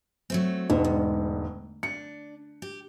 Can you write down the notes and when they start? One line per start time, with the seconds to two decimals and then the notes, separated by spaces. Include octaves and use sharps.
0.30 F#3 A3 C4
0.70 E1 G#2 B2
0.84 D2
1.83 D4 C#7
2.62 G4